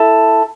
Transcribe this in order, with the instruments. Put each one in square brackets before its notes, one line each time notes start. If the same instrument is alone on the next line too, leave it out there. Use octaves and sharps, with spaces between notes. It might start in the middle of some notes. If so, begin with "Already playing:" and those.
Already playing: [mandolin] E4 A4